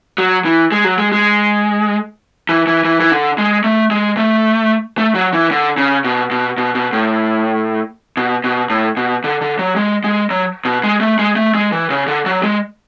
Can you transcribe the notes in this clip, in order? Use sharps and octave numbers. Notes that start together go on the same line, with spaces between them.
F#3
E3
G#3
F#3
G#3
G#3
E3
E3
E3
E3
D3
G#3
A3
G#3
A3
A3
F#3
E3
D3
C#3
B2
B2
B2
B2
A2
B2
B2
A2
B2
D3
D3
F#3
G#3
G#3
F#3
B2
G#3
A3
G#3
A3
G#3
E3
C#3
D3
F#3
G#3